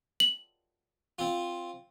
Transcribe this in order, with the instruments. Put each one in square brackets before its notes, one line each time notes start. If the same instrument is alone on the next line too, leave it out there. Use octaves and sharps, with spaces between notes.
[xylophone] F#7
[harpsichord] C4 F4